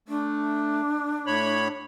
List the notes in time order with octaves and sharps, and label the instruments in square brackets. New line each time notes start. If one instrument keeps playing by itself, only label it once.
[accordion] A3 [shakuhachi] D4
[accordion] A2 C#5 B5